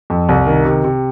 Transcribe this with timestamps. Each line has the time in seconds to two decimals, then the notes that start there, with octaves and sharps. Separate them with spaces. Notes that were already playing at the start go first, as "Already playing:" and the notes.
0.10 F2
0.29 C2
0.47 D#3
0.65 C3
0.84 C3